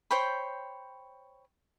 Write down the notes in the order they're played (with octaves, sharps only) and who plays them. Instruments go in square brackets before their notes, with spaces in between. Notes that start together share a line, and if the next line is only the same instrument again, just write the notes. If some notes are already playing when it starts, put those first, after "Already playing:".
[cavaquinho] C5 C#5 G5 B5